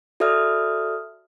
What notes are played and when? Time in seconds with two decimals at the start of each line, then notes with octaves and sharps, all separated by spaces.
0.20 F#4 A4 D5 E5 D#6 F6